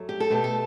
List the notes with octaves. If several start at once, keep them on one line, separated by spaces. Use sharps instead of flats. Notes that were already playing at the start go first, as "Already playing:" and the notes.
Already playing: G2 F#3 A3
G4
A4
B2 A3 G4
A4